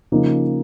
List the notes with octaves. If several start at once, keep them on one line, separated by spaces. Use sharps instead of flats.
C#3 F3 A#3 D#4